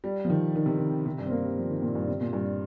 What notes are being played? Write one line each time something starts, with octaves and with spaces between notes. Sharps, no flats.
G3
F3
D#3
D#3
C3
D#3
C3
G2
C4
A#3
G3
F3
D#3
A#2
G2
C3
A#2
G2